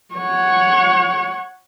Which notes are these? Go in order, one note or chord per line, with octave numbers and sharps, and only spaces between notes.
C#5 F#5